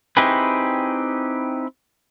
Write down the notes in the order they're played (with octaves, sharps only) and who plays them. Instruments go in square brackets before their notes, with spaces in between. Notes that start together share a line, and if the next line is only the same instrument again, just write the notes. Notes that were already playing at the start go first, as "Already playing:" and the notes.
[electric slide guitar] C4 D#4 E4 G4 G#4 B4